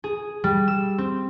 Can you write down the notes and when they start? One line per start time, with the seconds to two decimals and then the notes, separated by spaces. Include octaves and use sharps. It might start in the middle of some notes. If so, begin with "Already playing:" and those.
0.04 G#4
0.44 G3
0.68 E6
0.98 C4